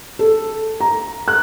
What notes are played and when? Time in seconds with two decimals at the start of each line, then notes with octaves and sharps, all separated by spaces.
0.19 A4
0.81 A#5
1.28 F#6